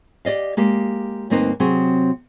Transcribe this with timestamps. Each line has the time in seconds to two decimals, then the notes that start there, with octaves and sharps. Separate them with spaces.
0.25 G4 D5 D#5 F5
0.57 G#3 A#3 G4
1.30 D2 G2 A#3 C4 D#4 B4
1.60 C3 F#3 C4 G#4